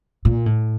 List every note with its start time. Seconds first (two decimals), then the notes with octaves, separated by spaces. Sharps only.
0.25 A#2
0.46 A2